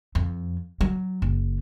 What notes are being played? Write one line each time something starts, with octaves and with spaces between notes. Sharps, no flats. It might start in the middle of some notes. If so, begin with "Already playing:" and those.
F2
F#3
F#1